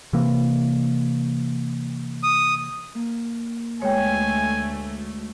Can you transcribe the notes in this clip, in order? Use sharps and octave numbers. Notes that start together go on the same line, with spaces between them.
C3 E3 A#3
D#6
A#3
D2 B2 G#3 A3 C#5 G5 G#5